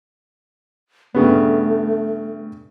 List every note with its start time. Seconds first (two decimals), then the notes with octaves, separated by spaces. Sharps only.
1.15 G2 C#3 A3 B3